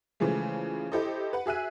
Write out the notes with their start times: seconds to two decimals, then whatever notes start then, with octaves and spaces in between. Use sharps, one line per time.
0.20 C#3 E3 F3 G#3 A3
0.92 E4 G4 A4 C5 D#5
1.33 B4 F#5
1.46 F#4 G#4 E5 F#6 D#7